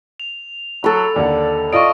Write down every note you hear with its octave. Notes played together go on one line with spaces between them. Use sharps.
F7
F#3 A4 B5
D#2 D3 D5 F#5
F4 D5 D#5 C#6 D7